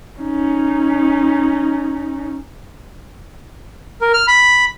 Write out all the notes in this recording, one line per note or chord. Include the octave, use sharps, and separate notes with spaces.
C#4 D#4
A#4
F6
B5